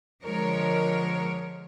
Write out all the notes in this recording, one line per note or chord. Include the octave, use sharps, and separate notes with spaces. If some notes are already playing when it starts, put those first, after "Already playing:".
D3 F3 G#3 A#4 C#5